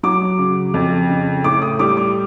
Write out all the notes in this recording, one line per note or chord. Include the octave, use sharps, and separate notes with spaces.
F#3 D6
C#3
F2
C#3
A2 D6
D#6
G3 D6
D6